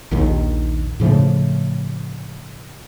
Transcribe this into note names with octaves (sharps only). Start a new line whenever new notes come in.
A#1 D#2 D#3
A2 C#3 F3 A3